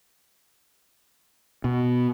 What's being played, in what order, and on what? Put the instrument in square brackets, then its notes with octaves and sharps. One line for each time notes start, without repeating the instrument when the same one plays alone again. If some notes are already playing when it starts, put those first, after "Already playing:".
[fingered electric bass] B2